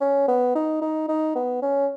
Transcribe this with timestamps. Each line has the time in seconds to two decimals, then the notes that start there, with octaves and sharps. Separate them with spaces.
0.01 C#4
0.28 B3
0.55 D#4
0.82 D#4
1.08 D#4
1.35 B3
1.62 C#4